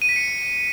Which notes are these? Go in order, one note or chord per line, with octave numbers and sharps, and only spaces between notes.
D#7
B6
C#7